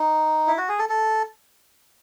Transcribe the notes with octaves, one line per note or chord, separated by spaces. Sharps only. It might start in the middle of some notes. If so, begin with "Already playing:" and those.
Already playing: D#4
E4
F#4
G#4
A4
A4